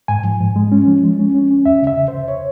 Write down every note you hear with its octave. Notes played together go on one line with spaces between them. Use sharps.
G#2 G#5
F3
G#2
G#3
C#4
F3
G#3
C#4
C#4
C#4
E2 E5
C#3 E5
C#3
C5
E2
C#5